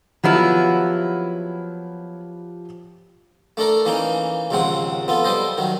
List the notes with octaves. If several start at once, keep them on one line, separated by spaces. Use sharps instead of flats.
F3 F#3 B3 E4 G4 F6
A3 D4 A4 A#4
E3 A#3 C#4 D#4
A#1 D#2 C#3 G#3 C4 F#5
B3 F4 A4
G3 A4 C5 D#5
D#3 F#3